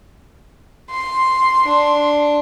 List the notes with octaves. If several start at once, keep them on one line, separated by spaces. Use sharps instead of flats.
C6
D4